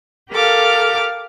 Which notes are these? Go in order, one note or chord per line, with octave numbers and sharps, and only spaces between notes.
G4 A4 A#4 F5 D6 F6